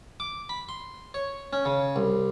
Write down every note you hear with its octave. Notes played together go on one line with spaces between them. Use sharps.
D6
B5
C6
C#5
C#4
C#3
C2